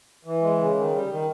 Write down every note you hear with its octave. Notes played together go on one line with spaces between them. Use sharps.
E3
G#3
C#3
D#3
G3
D#3